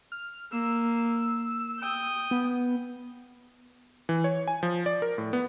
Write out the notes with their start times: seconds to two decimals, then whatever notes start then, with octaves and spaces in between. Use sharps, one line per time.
0.12 F6
0.52 A#3 E6
1.79 G5 D#6
2.31 B3
4.09 E3
4.24 C#5
4.48 G#5
4.63 F3
4.86 D5
5.02 A#4
5.18 A2
5.33 B3